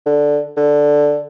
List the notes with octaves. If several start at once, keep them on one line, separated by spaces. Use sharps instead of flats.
D3
D3